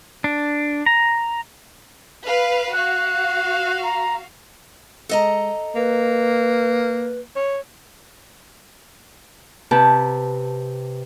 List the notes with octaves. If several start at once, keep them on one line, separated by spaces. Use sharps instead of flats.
D4
A#5
B4 F5
F#4 F5 F#6
A#5
G#3 A4 D#5 A#5
A#3 B4
C#5
C3 G4 B4 A5